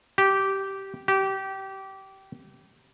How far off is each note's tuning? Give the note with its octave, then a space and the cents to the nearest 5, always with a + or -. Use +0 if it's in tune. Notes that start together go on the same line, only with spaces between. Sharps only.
G4 -10
G4 -20